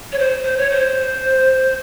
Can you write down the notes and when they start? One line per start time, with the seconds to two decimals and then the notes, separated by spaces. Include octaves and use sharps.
0.12 C#5
0.19 C5
0.44 C5
0.57 C#5
0.70 C5